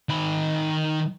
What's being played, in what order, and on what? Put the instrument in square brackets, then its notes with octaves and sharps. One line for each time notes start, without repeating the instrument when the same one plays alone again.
[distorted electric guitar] D#3 B5